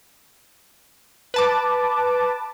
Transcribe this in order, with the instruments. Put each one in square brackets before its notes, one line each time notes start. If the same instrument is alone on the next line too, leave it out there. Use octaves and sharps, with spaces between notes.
[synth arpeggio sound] B4 A5 D6